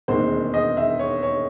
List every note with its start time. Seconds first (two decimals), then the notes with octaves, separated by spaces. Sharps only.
0.08 E1 D#2 D#3 G#3 C4 C5
0.54 D#5
0.77 E5
0.99 C#5
1.23 C#5